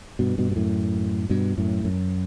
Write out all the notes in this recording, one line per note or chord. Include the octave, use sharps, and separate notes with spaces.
G2 B2
G2 B2
B2
F#2 A2
G2 B2
F#2 A2
F#2